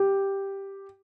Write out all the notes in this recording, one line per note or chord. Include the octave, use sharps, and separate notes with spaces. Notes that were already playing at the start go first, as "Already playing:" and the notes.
Already playing: G4